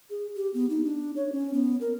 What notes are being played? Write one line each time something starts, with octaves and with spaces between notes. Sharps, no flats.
G#4
G4
B3
D#4
D4
C#5
C#4
B3
A#4